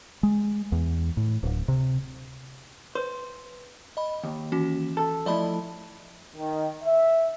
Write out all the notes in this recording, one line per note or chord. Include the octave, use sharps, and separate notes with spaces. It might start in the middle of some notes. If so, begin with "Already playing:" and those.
G#3
E2
A2
D1
C3
B4 C5
D#5 B5
D#2
E3 C#4 F#4
A4
F3 A3 E4 D5 D#5 B5
D#3
E5